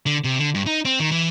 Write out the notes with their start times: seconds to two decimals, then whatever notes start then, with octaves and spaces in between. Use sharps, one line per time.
0.06 D3
0.24 C3
0.39 D3
0.54 G2
0.66 D#4
0.85 C4
1.00 D#3
1.11 E3